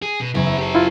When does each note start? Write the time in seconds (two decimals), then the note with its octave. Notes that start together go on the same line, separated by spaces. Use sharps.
0.02 G#4
0.21 B2
0.35 F#1 B3 C#4 E4 A#5
0.46 E5
0.58 G4 A4
0.75 E4 F4